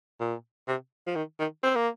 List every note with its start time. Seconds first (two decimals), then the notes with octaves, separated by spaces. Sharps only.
0.20 A#2
0.68 C3
1.07 F3
1.16 D#3
1.39 D#3
1.63 C4
1.76 A#3